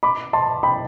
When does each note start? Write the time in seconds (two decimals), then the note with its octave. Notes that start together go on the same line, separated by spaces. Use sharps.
0.03 B5 D6
0.33 A5 C6
0.63 G5 B5